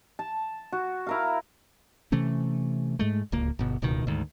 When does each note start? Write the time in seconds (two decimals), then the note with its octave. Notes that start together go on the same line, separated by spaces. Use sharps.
0.19 A5
0.72 F#4
1.07 E4 A#4 F5
2.12 C3 E3 A3 C#4
2.99 G#2 G#3 A3
3.32 D1 C#2 A#3
3.59 G1 B2
3.82 D1 C#2 B2 D#3
4.07 D2 G#2 D#3